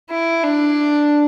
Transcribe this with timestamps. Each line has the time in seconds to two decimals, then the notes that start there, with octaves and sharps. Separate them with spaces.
0.11 E4
0.44 D4